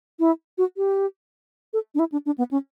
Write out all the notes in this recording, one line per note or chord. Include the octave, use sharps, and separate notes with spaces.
E4
F#4
G4
A4
D4
E4
D4
D4
B3
C#4